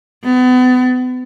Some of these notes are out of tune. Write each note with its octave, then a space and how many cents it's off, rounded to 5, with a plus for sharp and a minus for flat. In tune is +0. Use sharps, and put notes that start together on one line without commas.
B3 +35